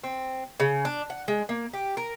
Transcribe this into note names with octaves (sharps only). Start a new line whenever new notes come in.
C4
C#3
D4
F#5
G#3
A#3
G4
A#4